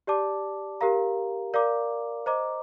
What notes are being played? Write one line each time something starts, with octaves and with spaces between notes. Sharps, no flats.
G4 D5 A5 D6
G4 A#4 F5 A#5
A#4 D5 F5 A#5 D6
C5 D#5 A#5 D6